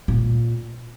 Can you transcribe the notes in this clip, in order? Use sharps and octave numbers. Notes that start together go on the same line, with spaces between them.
A#2